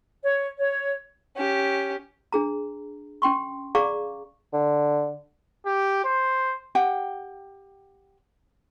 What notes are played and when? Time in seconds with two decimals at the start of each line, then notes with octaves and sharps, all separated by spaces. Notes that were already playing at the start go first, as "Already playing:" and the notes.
0.24 C#5
0.59 C#5
1.36 C#4 G4
2.32 D4 G#4 A#5
3.22 C#4 G5 C6 C#6
3.75 G#4 D5 F5 A#5 C#6 D6
4.53 D3
5.66 G4
6.04 C5
6.75 G4 F#5 G5